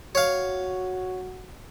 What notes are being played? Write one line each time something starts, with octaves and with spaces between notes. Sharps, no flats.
F#4 C#5 F5